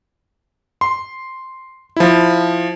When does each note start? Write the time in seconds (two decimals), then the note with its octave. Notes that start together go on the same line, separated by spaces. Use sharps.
0.81 C6
1.96 F3 E4